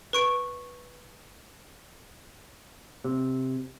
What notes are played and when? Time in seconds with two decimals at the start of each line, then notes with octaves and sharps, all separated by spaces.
0.13 B4 C#6 D7
3.04 C3